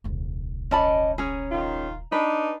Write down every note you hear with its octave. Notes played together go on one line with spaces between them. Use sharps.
D#1 C2
C#4 D#4 D5 D#5 A5 B5
C#4 G#4 A#5
D#3 F4
D4 D#4 B4